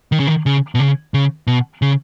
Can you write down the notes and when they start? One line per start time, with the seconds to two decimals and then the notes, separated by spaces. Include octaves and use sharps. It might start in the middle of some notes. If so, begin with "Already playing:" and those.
0.12 D#3
0.20 C#3
0.27 D#3
0.46 C#3
0.75 B2
0.80 C#3
1.14 C#3
1.47 B2
1.82 C#3